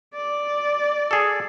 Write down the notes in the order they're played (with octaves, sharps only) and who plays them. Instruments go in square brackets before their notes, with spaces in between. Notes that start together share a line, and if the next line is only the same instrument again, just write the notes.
[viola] D5
[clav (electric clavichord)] G#4 A4